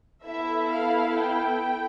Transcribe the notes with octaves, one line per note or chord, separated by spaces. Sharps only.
B3 E4 A4 E5
F5
G5